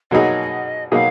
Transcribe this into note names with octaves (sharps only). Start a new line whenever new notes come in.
B2 F#3 A#3 D#4 G#4 D#5
B2 F#3 A#3 D#4 G#4 F5